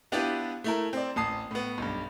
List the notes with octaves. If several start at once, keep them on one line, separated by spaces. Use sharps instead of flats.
B3 D4 E4 F4 G4 B4
A3 E4 A#4
C4 D5
A1 A5 D#6 C7
A2 B3
B1 G2